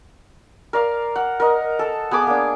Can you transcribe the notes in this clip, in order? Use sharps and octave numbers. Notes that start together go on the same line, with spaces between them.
A#4 D5 F5
F#5
A#4 D#5
A4 A5
B3 G#4 B5 D6
A#3 D4